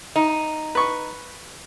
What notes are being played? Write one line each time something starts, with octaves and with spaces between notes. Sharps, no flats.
D#4
B4 C#6